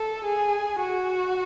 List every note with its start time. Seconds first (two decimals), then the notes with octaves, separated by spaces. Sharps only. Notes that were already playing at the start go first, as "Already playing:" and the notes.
Already playing: A4
0.24 G#4
0.79 F#4